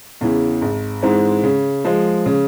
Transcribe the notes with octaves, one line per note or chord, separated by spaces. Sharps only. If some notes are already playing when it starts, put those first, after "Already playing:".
E2 C#3 E3
G#1
G#2 E3 G#3 C4
C#3
F3 G#3
C#3